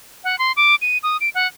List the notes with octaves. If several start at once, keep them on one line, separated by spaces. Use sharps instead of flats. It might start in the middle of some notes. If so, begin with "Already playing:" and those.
F#5
C6
D6
D#7
D#6
D7
F#5